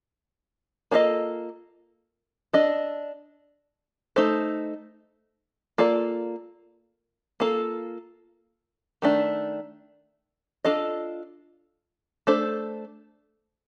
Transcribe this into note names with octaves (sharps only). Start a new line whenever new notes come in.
A#3 D4 F4 A4 D#5
D4 A4 D#5
A3 D#4 A4 C5
A#3 F4 A4 D5
A#3 F4 A4
D#3 A3 D4
D4 F4 A4 D#5
A3 D4 A4 C5